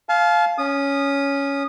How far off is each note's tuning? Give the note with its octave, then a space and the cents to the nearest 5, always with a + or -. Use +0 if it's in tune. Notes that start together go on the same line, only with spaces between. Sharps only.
F5 +0 A5 -40
C#4 +10 D#6 -15